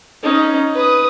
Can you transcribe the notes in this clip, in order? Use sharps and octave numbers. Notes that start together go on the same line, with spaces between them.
C#4 D#4
B4 D#6